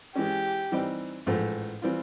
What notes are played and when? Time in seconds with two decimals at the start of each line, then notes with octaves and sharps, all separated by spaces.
0.16 E3 G#3 C#4 G4
0.72 E3 G3 C4 D#4
1.26 A1 G#2 F3 A3
1.82 E3 G3 C4 F4